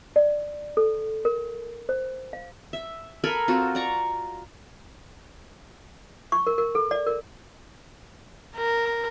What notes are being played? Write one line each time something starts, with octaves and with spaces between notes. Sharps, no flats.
D5
A4
A#4
C5
F5
E5
A4 A#4 G#5 B5
C4 F4 F#4
D5 A#5 C#6
C#6
A#4
A#4
A4
D5
A#4
A#4